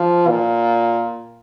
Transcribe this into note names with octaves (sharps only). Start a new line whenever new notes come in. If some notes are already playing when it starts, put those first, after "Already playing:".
Already playing: F3
A#2